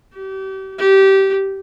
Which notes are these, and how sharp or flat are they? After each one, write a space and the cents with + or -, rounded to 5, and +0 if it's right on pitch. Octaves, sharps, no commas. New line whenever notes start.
G4 -35
G4 -20